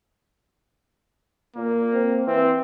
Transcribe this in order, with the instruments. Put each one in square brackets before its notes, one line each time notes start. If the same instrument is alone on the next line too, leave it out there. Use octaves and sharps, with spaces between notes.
[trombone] A#2 [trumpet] A#3
[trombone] C4
[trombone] E3 [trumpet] C4